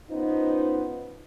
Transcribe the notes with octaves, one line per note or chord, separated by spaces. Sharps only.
B3 C#4 D#4 F4 B4 C5